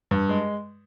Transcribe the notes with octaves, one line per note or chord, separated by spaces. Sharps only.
G2
G#3